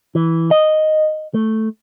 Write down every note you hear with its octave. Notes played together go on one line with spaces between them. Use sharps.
E3
D#5
A3